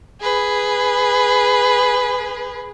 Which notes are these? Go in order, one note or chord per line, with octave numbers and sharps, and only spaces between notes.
G#4 B4